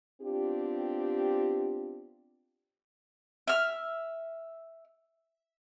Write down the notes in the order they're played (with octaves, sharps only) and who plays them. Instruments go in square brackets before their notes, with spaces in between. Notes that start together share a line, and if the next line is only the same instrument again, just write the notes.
[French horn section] B3 C4 D4 F4 G4
[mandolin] E5 F6